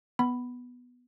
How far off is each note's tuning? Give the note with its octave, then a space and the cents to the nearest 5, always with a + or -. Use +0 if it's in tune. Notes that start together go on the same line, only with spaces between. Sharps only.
B3 +0 B5 +0